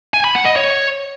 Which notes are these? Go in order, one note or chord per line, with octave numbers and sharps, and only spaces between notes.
G#5
B5
F#5
D#5
C#5